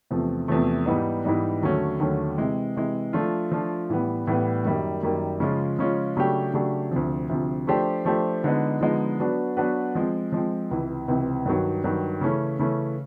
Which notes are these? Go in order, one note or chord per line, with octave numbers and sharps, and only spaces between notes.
E2 C3 F3 A3
E2 C3 F3 A3
G#2 E3 G3 B3 D#4
G#2 E3 G3 B3 D#4
D#2 D3 F#3 A3 C#4
D#2 D3 F#3 A3 C#4
C3 E3 G#3
C3 E3 G#3
F3 A3 D4 F4
F3 A3 D4 F4
A2 E3 G3 B3
A2 E3 G3 B3
F#2 D#3 G3 A#3
F#2 D#3 G3 A#3
C#3 F3 G#3 C#4 F4
C#3 F3 G#3 C#4 F4
C#3 F#3 A3 D4 G4
C#3 F#3 A3 D4 G4
D2 C3 F3
D2 C3 F3
F3 A3 D4 G4 C5
F3 A3 D4 G4 C5
D3 F3 G#3 B3 D#4
D3 F3 G#3 B3 D#4
F#3 B3 D4 F#4 B4
F#3 B3 D4 F#4 B4
F3 G#3 C4
F3 G#3 C4
C#2 C3 E3
C#2 C3 E3
G2 D#3 F#3
G2 D#3 F#3
C#3 E3 A3 C#4
C#3 E3 A3 C#4